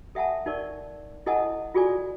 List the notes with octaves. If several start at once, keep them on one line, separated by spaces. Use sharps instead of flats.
A4 E5 F#5 G#5 A5
D#4 A#4 D5 C#6
E4 A4 D#5 F#5 G#5 A5
F4 F#4 G#4 A4 D5 G#5